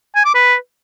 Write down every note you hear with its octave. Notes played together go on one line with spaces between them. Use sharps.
G#5
D6
B4